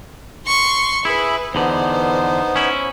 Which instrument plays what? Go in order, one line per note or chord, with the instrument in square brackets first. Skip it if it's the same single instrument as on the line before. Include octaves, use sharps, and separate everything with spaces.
[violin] C6 C#6
[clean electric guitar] E4 [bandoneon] G#4 E5 B5 [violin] B4
[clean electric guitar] E2 D3 [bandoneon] B3 D#4 [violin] C5
[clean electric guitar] C#4 E4